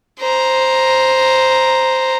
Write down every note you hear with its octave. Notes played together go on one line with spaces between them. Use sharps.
C5 A#5